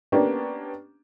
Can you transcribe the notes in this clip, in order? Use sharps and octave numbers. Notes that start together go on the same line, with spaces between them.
A#3 B3 C#4 D4 G4